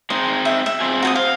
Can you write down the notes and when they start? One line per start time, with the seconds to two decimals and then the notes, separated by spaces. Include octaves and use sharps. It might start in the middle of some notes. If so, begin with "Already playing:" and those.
0.10 G#3 C4 D#4 C6
0.45 E5
0.66 E5
0.80 C4 F4 G#4
1.03 F#4 G5 D#6
1.16 C5 F5